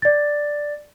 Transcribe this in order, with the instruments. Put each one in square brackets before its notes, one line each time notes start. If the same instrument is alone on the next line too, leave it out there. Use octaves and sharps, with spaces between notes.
[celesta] D5 A6